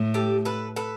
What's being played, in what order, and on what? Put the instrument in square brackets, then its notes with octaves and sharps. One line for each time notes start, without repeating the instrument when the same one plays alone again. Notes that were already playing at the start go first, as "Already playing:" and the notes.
Already playing: [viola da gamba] A2
[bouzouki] G4 A4
A4 B4
A4 B4